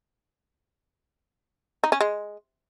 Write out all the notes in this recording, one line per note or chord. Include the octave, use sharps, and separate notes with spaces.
D#4
C#4
G#3